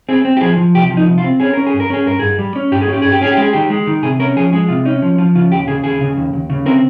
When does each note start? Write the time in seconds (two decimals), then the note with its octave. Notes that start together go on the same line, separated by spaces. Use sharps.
0.09 C4 G#4
0.25 C4
0.37 G4
0.41 F3 G#4
0.57 F3
0.75 C2 G4
0.90 F3
0.97 D#4
1.07 C2
1.18 F4
1.24 C4
1.40 C#4 G#4
1.53 C#4 A#4
1.67 G#4
1.74 G2
1.80 A#4
1.90 C#4 G#4
2.06 G2 A#4
2.19 G2 G#4
2.39 G3
2.56 C#4
2.72 G2 G4
2.81 G#4
2.88 C#4 G4
3.02 G2 G#4
3.12 G4
3.21 C#4 G#4
3.32 G4
3.37 G#3
3.43 G#4
3.53 D#3 G4
3.70 G#3
3.87 D#3
4.03 C3 G#4
4.20 C#4 A#4
4.36 F3 G#4
4.53 G#3 G#4
4.68 C3 F4
4.85 C#4 D#4
5.02 F3
5.18 F3 F4
5.35 C#3 F4
5.51 D#2 G4
5.67 C#3 G#4
5.84 D#2 G#4
6.01 C#3
6.17 D#2
6.33 D#2
6.50 C#3
6.66 C4 A#4